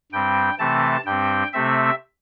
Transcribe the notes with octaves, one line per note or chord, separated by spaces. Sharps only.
G2 G3 C4 G5
C3 E3 A3 C4 A5
G2 G3 C4 G5
C3 A3 C4 E5